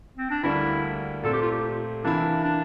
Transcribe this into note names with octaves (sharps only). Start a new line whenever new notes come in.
C4
D4
D2 D3 G3 A#3 D4 E4
A#2 A3 C4 A4
G4
F4
G4
C3 E3 A#3 D4 E4
D4